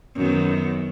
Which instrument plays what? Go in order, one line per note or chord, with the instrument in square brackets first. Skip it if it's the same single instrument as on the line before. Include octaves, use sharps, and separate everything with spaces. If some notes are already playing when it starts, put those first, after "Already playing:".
[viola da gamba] F#2 D#3 B3